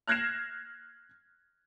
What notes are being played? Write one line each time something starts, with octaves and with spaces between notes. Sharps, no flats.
F6 F#6 G#6 A#6 C7 E7